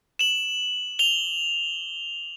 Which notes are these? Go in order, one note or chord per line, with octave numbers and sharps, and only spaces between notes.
E7 F#7
F7 G7